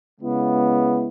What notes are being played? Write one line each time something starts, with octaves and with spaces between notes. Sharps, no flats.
C#3 G#3 B3 E4